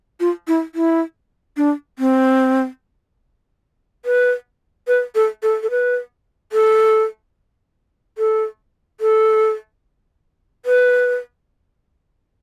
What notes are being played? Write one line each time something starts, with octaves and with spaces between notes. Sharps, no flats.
F4
E4
E4
D4
C4
B4
B4
A4
A4
A4
B4
A4
A4
A4
B4